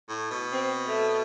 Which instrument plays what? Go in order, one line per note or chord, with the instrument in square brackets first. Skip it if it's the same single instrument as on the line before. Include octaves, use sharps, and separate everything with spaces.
[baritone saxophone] A2
B2
[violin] C4
A3